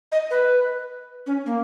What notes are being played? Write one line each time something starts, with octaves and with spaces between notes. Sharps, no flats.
D#5
B4
C#4
A#3